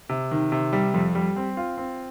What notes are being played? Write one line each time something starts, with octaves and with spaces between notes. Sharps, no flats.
C3
D#3
C3
G3
F2
G3
C4
F4
C4